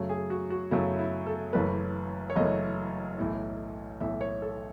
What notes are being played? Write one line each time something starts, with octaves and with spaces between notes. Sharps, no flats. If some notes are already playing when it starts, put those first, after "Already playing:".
Already playing: F#2 C#3 F#3 A3
G#4
F#4
F#4
F#2 C#3 F#3 A3 E4
E4
A4
F#1 F#2 E3 A3 B4
C#5
F#1 F#2 E3 A3 D#5
B1 A2 E3
B1 A2 E3 E5
C#5
A4